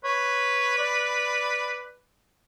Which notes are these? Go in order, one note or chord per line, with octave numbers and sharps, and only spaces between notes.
B4 C#5
D5